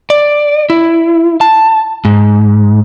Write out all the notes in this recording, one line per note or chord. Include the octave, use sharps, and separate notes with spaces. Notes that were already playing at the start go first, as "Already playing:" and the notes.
D5
E4
A5
G#2